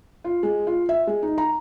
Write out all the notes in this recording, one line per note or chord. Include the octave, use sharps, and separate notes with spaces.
F4
G#3
F4
E5
G#3
D#4
A#5